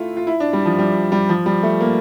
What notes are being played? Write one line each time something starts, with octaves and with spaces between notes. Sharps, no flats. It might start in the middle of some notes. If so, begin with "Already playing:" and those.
Already playing: A3 E4 F4
F4
E4
D4
G3
F3
G3
G3
F3
G3
A3
A#3